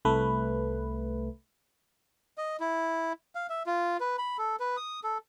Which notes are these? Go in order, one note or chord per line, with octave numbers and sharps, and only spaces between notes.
C2 A3 B4
D#5
E4
F5
E5
F4
B4
B5
A4
B4
D#6
A4